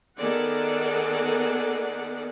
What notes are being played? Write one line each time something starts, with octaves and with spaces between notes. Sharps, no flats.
D#3 B3 G#4 A4 D5 F#5